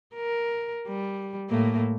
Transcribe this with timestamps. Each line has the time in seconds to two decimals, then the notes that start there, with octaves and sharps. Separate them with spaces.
0.15 A#4
0.87 G3
1.49 A2 A3 A#3